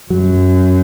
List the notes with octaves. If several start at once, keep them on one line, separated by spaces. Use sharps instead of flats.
F#2 F#3